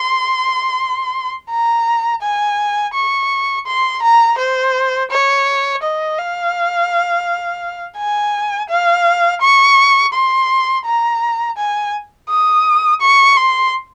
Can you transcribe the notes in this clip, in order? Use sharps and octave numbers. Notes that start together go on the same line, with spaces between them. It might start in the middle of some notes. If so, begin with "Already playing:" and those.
Already playing: C6
A#5
G#5
C#6
C6
A#5
C5
C#5
D#5
F5
G#5
F5
C#6
C6
A#5
G#5
D#6
C#6
C6